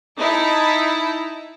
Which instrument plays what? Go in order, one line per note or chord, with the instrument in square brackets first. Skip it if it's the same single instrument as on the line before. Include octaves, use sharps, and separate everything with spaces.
[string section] D#4 E4 A5